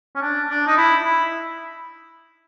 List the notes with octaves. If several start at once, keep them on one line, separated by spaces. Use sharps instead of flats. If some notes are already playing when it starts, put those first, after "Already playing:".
C#4
D4
D4
D#4
E4
E4